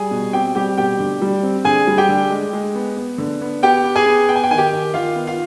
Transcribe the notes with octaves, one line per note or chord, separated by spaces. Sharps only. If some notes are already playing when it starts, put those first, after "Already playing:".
Already playing: G3 G#4 G#5
B2
C4 G4 G5
G3 G4 G5
B2 G4 G5
D3
G3
C4
D3 G#4 G#5
G3
G4 G5
D3
G#3
G#3
B3
B3
D3
B3
B3 G4 G5
B3
G#4 G#5
B3
B3 G5
G#5
G5
D#3 G#5
G4 G5
D#3
D#3 F4 F5
B3
F4 F5